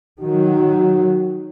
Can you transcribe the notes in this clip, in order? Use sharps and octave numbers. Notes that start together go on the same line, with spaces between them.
D#3 F#3 F#4